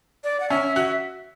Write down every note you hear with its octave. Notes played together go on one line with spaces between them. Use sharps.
D5
F#5
C#4 E5
F#4 E5